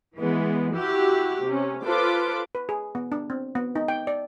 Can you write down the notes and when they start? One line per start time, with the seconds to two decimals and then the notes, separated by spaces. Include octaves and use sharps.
0.17 E3 G#3 B3
0.73 E4 F#4 G4
1.44 C3 C#4
1.85 F4 A4 B4 C5 D6
2.55 B4
2.69 G#4
2.95 B3
3.12 D4
3.30 C4
3.55 B3
3.75 D#4
3.88 G5
4.07 D5